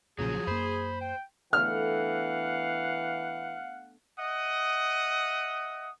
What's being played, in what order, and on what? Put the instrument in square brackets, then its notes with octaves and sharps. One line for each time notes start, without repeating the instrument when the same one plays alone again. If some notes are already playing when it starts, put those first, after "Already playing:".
[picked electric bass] B1 A#2 C#3 [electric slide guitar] F3 F#3 [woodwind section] G#4
[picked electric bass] F#2 A#3 [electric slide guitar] C5 [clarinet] B5
[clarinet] G5
[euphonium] E3 [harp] A3 B3 D4 [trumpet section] F5 F#5 [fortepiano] F6
[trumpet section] D#5 E5 F#5 D#6